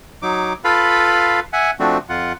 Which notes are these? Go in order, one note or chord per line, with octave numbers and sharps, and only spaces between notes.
F#3 D#4 D6
F4 A4 B4 F5 B5
E5 F#5 G#5
F3 A3 C4 D4 F#4
F2 F4 F#5